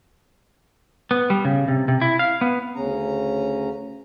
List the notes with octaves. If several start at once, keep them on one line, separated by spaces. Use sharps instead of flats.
B3
G3
C#3
C3
C3
E4
F5
B3
D2 C#3 C#4 A#5